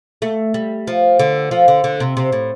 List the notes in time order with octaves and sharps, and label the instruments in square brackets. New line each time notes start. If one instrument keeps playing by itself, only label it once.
[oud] A3
G3
F3
D3
F3
D3
D3
C3
C3
A2